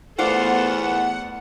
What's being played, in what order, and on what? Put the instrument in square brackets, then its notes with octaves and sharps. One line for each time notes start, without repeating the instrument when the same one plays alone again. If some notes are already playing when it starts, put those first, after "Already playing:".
[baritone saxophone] E2 [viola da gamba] A3 B3 A4 [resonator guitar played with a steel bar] F4 C5 D5 [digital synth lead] F#5